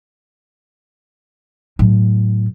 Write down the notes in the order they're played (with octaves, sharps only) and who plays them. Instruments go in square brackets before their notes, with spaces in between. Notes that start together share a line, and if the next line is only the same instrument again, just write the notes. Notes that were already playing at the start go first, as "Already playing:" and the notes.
[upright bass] A2 F#3